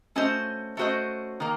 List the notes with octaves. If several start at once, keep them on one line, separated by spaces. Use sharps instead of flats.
A3 C#4 F#4 C5 D#5
A3 C#4 F#4 C5 D#5
D#3 A#3